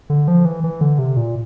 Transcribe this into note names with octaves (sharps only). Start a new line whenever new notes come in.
D3
F3
E3
E3
D3
C3
A#2